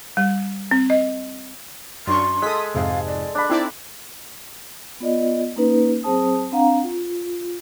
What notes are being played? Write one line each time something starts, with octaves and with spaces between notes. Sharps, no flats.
G3
C4
D#5
F#2 D4 C6 C#6
G#3 A4 D#6 B6
F2 G#2 C3 F5
D5
D4 B5
C4 D#4 E4 D5
B3 F4 D5 D#5
A#3 C#4 D#4 B4
F#3 C4 G#4 C5 A5 D#6
C4 D4 F5 F#5 A#5
F4